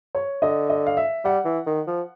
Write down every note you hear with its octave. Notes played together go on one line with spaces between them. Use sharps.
C#5
D3 D#5
D#5
F5
E5
G3 F#5
E3
D#3
F3